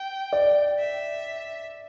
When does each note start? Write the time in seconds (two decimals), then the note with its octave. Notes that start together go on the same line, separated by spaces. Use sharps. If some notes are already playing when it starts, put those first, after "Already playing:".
Already playing: G5
0.33 D5
0.79 E5